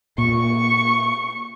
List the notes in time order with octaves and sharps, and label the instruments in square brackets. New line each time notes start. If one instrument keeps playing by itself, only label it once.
[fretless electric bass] A#2 [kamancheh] C#6